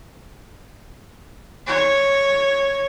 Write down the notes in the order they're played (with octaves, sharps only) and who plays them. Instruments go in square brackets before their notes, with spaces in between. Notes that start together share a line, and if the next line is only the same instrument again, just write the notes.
[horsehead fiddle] C#5